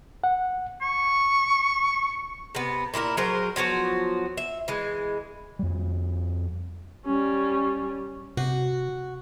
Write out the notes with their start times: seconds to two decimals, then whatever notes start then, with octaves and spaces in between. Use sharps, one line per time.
0.24 F#5
0.81 C#6
2.55 C3 B3
2.94 A#2 E4 A4 A#4
3.17 F#3 G#4 A#4 C5
3.56 F3 F#3 B3 F#4
4.37 E5
4.68 E3 G#3
5.59 F2 G3
7.06 G3 C#4
8.37 C3 F#4